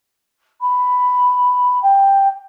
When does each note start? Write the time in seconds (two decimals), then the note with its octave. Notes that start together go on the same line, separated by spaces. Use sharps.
0.61 B5
1.82 G5